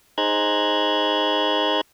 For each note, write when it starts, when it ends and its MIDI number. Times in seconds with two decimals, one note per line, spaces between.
0.18 1.81 63
0.18 1.81 68
0.18 1.81 72
0.18 1.81 82
0.18 1.81 90
0.18 1.81 92